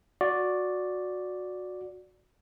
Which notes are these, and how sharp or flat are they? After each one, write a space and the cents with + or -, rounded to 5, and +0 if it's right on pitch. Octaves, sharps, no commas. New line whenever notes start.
F#4 -20 D5 +0